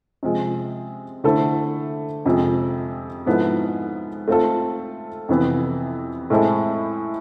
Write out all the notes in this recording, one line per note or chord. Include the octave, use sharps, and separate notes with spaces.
C3 F3 G#3
D3 A3 E4 A4 C5
F2 C3 F3 G#3
G#2 F3 B3 E4 A4
A3 C4 F4 A4
F2 C3 E3 B3
A2 G#3 C4 E4 A4